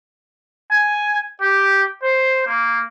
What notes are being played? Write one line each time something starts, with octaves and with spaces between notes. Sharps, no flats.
G#5
G4
C5
A#3